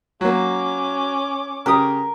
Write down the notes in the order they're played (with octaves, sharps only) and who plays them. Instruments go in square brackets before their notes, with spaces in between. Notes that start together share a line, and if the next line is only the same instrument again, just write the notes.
[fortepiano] F#3 A#3 [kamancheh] C#4 D6
[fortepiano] C#3 G4 D#6 [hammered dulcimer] A#4